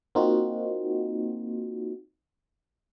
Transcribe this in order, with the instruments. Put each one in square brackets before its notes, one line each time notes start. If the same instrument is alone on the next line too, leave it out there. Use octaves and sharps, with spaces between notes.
[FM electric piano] A#3 C4 D#4 F4 F#4